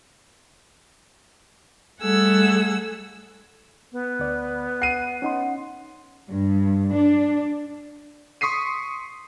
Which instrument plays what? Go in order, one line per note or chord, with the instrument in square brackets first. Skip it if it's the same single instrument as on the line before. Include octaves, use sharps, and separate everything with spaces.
[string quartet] G3 A3 G#4 A4 F#5 E6
[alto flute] B3
[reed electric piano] D2 D5
[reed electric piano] F#5 [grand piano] C7 D#7
[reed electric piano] C#4 D#4 C6 [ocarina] F#5
[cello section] G2
D4
[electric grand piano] C6 C#6 D#6 B6 C7 D#7